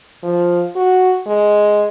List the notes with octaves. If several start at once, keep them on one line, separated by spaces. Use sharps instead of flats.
F3
F#4
G#3